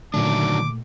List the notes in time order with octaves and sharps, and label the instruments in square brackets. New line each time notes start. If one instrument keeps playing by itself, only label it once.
[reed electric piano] A#2 A3 [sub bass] D3 [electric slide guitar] D#3 F#3 D4 [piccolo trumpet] D6